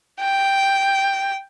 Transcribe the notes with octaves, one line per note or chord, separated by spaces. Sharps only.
G5